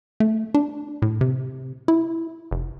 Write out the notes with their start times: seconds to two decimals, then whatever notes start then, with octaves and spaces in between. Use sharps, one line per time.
0.20 A3
0.54 D4
1.02 A2
1.21 C3
1.88 E4
2.51 F1